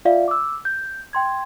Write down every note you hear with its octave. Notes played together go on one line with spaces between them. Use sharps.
F4 D5 E5 F5
D6 E6
G6
G5 C6 G#6